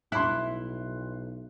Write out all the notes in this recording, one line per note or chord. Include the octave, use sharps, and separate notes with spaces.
B1 E4 C6 F#6